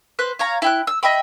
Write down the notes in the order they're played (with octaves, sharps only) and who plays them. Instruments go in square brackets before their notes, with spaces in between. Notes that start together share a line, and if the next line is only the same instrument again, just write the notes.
[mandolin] B4 C5 F#6
C#5 F5 A#5
E4 G5 F#6
E6
D#5 E5 G5 B5